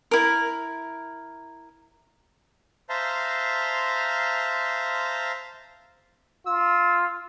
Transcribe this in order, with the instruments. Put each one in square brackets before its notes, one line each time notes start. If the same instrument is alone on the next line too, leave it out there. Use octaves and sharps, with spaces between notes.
[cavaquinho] E4 A#4
[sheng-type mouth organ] C5 E5 F5 A5 A#5 C6
[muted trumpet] F4 [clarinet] E6